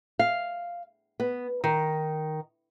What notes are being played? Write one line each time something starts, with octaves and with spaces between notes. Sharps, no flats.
F5
B3
D#3